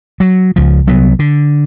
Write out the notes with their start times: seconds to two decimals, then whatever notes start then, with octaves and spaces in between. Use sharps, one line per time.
0.20 F#3
0.56 C#2 F3
0.87 C2 F#3 B3
1.19 D3